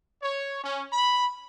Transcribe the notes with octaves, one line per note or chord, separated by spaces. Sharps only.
C#5
C#4
B5